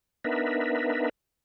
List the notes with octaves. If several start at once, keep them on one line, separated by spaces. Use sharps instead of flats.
B3 D4 D#4 A#4 B4 E5